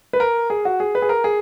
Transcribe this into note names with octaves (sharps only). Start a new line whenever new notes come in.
B4
A#4
G#4
F#4
G#4
B4
G#4
A#4
G#4